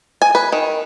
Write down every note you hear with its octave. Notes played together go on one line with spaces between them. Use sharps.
G#5
B4
D#3